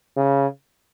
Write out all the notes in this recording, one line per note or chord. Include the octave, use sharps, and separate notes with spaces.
C#3